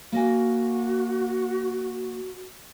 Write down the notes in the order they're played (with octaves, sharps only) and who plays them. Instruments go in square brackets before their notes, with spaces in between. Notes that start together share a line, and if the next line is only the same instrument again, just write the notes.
[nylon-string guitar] A#3 D#5 G#5 [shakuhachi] F#4